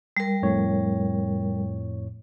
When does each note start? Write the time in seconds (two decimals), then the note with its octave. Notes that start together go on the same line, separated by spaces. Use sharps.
0.17 G3 A#4
0.43 F2 A2 C#5